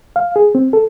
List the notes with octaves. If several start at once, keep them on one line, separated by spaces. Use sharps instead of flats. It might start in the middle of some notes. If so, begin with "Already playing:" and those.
F5
G#4
C4
A4